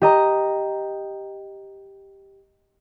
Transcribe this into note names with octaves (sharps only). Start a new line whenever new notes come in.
G4 D#5 A#5